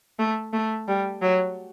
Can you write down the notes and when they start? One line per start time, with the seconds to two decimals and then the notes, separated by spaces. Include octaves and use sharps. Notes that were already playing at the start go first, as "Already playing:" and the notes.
0.19 A3
0.53 A3
0.88 G3
1.22 F#3